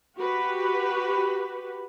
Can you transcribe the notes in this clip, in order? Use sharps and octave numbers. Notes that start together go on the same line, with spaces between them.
F#4 G4 B4